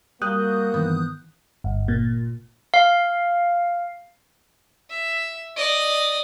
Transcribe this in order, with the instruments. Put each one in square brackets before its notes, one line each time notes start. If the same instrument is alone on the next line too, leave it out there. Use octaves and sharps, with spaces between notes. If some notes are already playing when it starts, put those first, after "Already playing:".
[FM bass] G3 [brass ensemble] A#3 F#4 [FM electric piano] D#6 F#6 G6
[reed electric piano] G2 D#3 E3 [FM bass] B3
[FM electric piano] G1
A#2
[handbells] F5
[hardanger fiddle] E5
D5 D#5